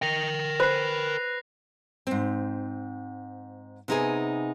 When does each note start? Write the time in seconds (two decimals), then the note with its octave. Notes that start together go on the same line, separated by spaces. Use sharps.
0.02 A#4 G5 A#6 F7
0.60 B4 C5 F#6 C7
2.07 G#2 C4
3.88 C3 B3 D#4 G4 G#4 G#5